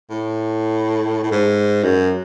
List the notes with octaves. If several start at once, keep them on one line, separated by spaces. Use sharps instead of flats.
A2
A2
G#2
F#2